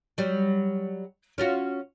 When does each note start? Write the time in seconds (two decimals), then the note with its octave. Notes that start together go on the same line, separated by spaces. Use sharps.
0.18 F#3 G3
1.38 C#4 F4 F#4